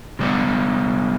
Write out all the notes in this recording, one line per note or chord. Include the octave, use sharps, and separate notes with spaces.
C3 G3 B3